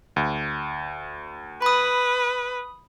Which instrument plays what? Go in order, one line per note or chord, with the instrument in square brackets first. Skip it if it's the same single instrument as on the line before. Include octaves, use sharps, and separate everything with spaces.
[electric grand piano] D2
[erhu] B4 [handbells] B5 D#6